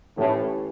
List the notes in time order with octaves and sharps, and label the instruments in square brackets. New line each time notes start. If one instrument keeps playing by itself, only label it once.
[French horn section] A2 [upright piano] E3 A3 C#4 E4 G4